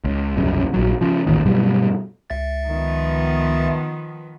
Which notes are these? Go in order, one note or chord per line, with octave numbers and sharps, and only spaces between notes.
C#2
E1 C2 F#2 C#3
A#1 F#3
C#3 F3
D#1 A1 D#2 D#3
G2 B2 F#3 G3
C#2 E5 A6
D#3 F3 B3